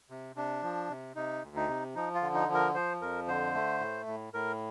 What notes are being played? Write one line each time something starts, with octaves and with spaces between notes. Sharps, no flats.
C3
C3 D4
F3
C3
C3 D#4
D2
D#4
C3
F3 D#4
F4
D3
D#4
F3
A#4
F3 C5
F2 A#4
D3 C5
A3
A2
A2
A2 A#4